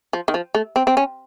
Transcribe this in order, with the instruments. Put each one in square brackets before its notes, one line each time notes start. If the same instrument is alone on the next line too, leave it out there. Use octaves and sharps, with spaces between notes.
[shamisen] F3
D#3
F3
A3
C4
C4
C#4